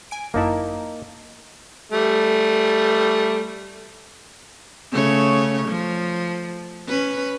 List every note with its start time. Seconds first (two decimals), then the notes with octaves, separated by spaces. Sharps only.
0.11 G#5 D7
0.34 G1 F#2 A#3 D#4 E4 A5
1.92 G3 A3
4.92 C#3 A3 C#5
5.68 F3
6.88 C#4 B4